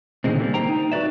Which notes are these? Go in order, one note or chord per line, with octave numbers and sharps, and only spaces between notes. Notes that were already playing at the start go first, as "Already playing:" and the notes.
A#2 D3 D#3 F3 G#3 C4
G3 A#3
C5 G5 A#5
D#4
F#4 B4 D5 E5